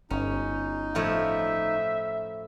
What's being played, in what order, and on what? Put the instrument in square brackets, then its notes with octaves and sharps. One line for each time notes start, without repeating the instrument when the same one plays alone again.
[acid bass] G1 [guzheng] C#4 [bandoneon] D#4
[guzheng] A2 F3 C#5 [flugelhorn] E5